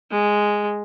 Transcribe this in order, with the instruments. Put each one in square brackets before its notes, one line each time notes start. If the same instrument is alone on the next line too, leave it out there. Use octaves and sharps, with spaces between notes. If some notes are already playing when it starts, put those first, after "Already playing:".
[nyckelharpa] G#3